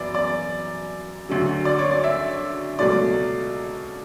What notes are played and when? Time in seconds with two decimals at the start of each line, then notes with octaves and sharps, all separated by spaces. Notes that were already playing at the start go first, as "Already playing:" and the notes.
Already playing: F#2 E3 B3 D5
0.14 D5
1.29 D2 D3 F#3
1.65 D5
1.78 C#5
1.91 D5
2.04 E5
2.79 C#2 B2 F#3 A3 D5